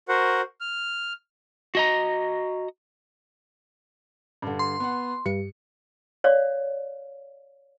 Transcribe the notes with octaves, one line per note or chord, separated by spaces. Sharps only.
F#4 A#4 C5 F#5
F6
F#4 D#5 A#5
G2 D3
C6
B3 F#5
G2 C#7
C#5 D5 F5